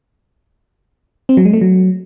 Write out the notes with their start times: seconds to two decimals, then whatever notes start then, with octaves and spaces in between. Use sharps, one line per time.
1.29 C4
1.37 F#3
1.45 G#3
1.53 A3
1.61 F#3